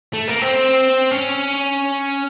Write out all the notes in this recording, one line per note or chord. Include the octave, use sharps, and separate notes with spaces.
A3
A#3
C4
C#4